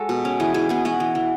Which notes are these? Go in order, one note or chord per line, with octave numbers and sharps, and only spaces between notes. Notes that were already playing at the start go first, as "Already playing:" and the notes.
Already playing: G#3 F#4 A4
B2
C#4
E3 G#4
E3 G#4
B3 G#4
B3 F#4
E3
E3